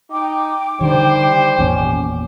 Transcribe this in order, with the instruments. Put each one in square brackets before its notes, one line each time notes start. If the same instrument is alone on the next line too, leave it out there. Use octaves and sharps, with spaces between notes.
[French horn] D#4 [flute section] G5 D6
[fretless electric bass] D3 D#3 [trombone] G3 [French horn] C5
[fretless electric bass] G#1 E2 A#2 [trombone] C#4